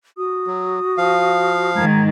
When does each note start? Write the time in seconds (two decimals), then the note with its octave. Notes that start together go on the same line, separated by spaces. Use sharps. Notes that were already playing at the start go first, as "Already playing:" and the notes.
0.16 F#4 D#6
0.47 F#3
0.97 F3 F5
1.74 G#2 D#3 A#5 G#6